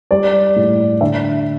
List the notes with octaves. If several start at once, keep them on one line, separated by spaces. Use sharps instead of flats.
G3 D5
A2
D3 E5